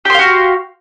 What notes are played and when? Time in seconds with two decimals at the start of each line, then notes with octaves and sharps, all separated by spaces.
0.05 G4
0.10 C6
0.14 F5
0.19 F#4